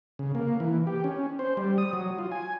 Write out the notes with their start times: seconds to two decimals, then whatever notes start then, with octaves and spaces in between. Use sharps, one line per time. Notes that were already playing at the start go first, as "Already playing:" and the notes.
0.19 C#3
0.35 A#3
0.60 E3
0.87 G4
1.04 C#4
1.39 C5
1.57 G3
1.78 D#6
1.93 F#3
2.19 F4
2.32 G#5